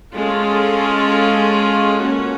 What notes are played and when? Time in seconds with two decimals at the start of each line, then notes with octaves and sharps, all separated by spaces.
0.15 G#3 C#4 F4 A4
2.02 A#3 C#4 F#4